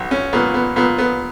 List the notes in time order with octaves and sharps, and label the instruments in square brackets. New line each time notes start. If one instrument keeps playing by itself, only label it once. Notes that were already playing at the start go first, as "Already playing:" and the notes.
Already playing: [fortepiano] B1
C#4
A#2 B3
B3
A#2 B3
B3